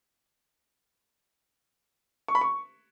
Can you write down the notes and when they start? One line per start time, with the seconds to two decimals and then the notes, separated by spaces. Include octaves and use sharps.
2.28 C#6
2.35 B5
2.41 C#6